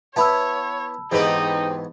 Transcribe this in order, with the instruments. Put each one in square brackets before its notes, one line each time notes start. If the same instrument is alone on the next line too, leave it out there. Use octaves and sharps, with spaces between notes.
[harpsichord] B3 E4 B4 [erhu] C#5 [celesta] A5 B5 E6
[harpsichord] E2 G#2 B3 [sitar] C4 G4 B4 [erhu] D#4